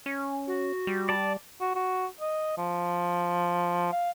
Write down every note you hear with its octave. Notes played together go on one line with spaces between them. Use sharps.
C#4
F#4
G3
D5 A5
F#4
F#4
D#5
F3
F5